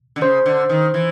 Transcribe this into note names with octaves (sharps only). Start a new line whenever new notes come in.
D3
C#3 C5
D3
D#3
E3